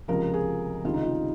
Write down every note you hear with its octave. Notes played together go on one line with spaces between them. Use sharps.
C#2 C3 F3 A#4
G#4
C#2 C3 D#3 G3 F4
D#4
F4